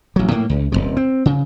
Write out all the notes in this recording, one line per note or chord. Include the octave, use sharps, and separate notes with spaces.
A1 F#3
A2 A#3
C#2
D#1 C#2 C3
C4
C#3